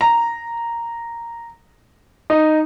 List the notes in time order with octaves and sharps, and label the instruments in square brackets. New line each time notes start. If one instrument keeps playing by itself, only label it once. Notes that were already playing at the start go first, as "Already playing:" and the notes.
[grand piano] A#5
D#4